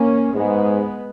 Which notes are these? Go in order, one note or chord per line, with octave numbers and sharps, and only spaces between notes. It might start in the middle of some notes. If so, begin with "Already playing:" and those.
Already playing: A#3 C#4
G#2 G#3 B3